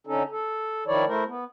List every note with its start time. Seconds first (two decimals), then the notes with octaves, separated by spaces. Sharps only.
0.07 D3 C#4 D#4 A4
0.31 A4
0.87 D#3 F3 E4 C#5 D5
1.08 A3 E4 A#4 C5
1.27 B3